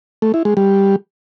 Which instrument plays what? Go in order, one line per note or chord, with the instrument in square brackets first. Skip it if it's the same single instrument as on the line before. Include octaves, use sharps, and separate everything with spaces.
[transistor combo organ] A3
E4
G#3
G3